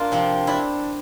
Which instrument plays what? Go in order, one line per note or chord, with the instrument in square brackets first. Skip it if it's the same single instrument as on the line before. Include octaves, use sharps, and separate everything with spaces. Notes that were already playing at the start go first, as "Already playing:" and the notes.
Already playing: [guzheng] A#3 D4 F4
C3 F3 C4
D4 E4